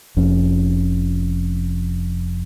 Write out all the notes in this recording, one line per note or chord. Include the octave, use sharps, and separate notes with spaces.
F1 F2 C#4